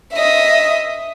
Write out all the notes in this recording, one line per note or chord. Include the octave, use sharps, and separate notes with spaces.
D#5 E5